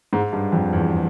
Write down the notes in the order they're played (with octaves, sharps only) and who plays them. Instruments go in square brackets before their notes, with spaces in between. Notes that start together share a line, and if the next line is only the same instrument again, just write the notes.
[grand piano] G#2
G2
F2
E2